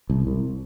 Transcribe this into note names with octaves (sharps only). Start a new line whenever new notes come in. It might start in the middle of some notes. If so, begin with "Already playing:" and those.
C2
C2